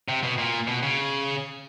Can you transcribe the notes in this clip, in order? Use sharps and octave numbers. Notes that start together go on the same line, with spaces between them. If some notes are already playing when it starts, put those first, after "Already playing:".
C3
B2
A#2
B2
C#3